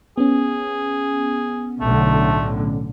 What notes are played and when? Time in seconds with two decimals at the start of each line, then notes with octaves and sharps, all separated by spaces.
0.18 B3 C#4 G#4
1.81 B1 A2 D3 A3